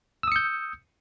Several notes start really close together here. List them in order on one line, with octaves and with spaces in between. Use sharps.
E6 D#6 C#7 G6